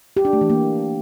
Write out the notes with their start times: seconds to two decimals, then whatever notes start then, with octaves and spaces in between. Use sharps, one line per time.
0.17 G4
0.25 D4
0.33 A3
0.41 E3
0.50 A#3